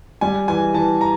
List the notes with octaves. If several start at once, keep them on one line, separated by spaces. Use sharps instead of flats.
G3 G#5
E3 G#5
E3 A5
A#5